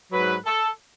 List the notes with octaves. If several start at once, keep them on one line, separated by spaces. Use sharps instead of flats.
G#2 F#3 B4
A4